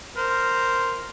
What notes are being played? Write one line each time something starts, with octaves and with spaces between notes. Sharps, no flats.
A#4 C5